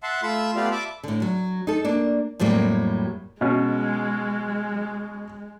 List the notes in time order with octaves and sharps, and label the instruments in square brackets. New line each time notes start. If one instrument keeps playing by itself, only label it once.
[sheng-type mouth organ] E5 F#5 A5 C6
A3 F4 E5 B5 E6
A3 B3 F4 G4 D5 F5
E5 A5 B5 D6
[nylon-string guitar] A2 D3
F#3
D#4 A4
A#3 D4
F2 A2 F#3 G3 A#3
[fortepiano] B2 C#4 [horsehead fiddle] G#3